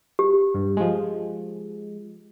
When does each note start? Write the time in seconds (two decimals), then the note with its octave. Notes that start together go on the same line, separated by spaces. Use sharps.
0.19 G4
0.55 G2
0.77 F3 G#3